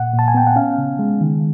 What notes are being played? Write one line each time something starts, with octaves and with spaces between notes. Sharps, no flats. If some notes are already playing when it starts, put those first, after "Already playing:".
Already playing: A#2 F#5
A#2
A5
G#5
B3 G5
F#5
C#4 F5
C#3
G#3
D#3